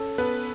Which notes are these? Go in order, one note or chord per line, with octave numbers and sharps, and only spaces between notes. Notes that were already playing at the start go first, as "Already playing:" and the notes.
Already playing: C#4 A4
B3 A4 B4